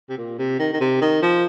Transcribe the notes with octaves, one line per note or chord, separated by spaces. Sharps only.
C3
A#2
C3
D#3
D#3
C3
D#3
F3